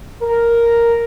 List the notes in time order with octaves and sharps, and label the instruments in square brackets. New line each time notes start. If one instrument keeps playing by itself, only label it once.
[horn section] A#4